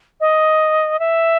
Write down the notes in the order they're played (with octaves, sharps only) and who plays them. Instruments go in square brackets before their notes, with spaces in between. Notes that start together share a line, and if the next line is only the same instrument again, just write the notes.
[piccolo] D#5
E5